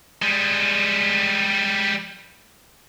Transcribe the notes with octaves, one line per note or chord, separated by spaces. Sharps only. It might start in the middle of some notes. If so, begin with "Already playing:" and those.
G3 G#3